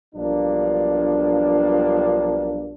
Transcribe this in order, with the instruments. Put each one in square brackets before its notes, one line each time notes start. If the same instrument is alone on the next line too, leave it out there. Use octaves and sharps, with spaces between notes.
[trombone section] B1 G2 F3 A#3 D4